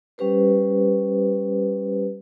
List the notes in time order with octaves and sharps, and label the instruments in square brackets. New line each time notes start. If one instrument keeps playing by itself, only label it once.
[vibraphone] G3 C#4 G4 B4 C5